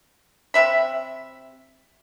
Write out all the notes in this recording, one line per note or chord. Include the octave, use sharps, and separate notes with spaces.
C3 E5 B5